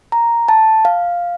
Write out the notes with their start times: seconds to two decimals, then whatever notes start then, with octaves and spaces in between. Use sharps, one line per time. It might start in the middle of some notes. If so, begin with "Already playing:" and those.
0.12 A#5
0.48 A5
0.85 F5